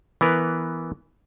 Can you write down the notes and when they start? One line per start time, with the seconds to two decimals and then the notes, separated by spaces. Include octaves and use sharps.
0.21 E3 B3 A#4 B4